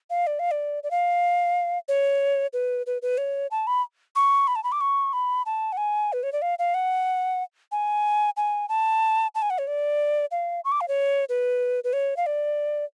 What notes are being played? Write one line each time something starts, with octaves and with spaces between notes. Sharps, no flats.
F5
D5
F5
D5
D5
F5
C#5
B4
B4
B4
C#5
A5
B5
C#6
B5
A5
B5
D6
C#6
B5
A5
F#5
G#5
B4
C#5
D5
F5
F5
F#5
G#5
G#5
A5
A5
G#5
F#5
C#5
D5
F5
C#6
D6
F5
C#5
B4
B4
C#5
F5
D5